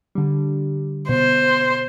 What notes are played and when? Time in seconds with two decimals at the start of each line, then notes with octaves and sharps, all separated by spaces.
0.15 D3 G3
1.09 B2 C5